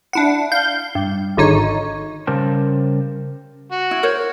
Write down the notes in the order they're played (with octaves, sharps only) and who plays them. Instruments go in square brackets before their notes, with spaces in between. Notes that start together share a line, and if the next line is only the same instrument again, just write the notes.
[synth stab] D4 E4 F#5
F5 G6
G2
G#1 D3 D#4 C#5
[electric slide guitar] C#3 G3 A#4 C5 A5
[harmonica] F#4
[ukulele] E4
A#4 C5 C#5